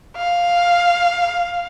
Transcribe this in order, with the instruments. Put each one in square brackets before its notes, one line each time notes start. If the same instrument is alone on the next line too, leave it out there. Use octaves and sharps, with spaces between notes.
[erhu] F5